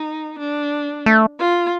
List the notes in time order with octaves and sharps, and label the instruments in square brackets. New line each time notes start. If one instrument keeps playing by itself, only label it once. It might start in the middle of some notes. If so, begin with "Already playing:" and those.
Already playing: [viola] D#4
D4
[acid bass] A3
[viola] F4